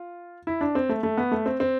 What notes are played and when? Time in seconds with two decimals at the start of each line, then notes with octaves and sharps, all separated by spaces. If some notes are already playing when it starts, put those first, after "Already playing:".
Already playing: F4
0.47 E4
0.61 D4
0.75 C4
0.89 A3
1.03 A3
1.17 B3
1.32 A3
1.46 C4
1.60 C4